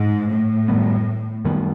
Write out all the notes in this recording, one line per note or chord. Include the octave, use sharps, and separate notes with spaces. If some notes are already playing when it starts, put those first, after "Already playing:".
Already playing: G#2
A2
F#2 D#3 G3 B3
F#2 D#3 G3 B3